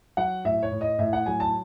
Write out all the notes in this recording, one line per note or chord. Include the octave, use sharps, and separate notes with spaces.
F#3 F#5
A2 E5
C#5
A2
D#5
A2 E5
F#5
F#3 G#5
A5